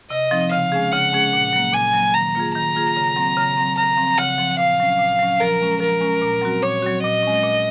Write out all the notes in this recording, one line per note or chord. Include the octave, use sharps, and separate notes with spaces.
C3 D#5
F3 C4 D#4
C#3 F5
G#3 C#4 G#4
C#3 F#5
G#3 C#4 G#4
A#2
F#3 A#3
A#2 G#5
F#3 A#3
D#3 A#5
A#3 F4 G#4
D#3 A#5
A#3 F4 G#4
C#3
F#3 C4
C#3
F#3 C4
C#3 A#5
F3 C4
C#3 F#5
F3 C4
A#2 F5
F#3 C#4
A#2
F#3 C#4
F3 A#4
G#3 C#4
F3 A#4
G#3 C#4
A#2
F#3 C4 F#4
A#2 C#5
F#3 C4 F#4
A#2 D#5
G#3 C#4
A#2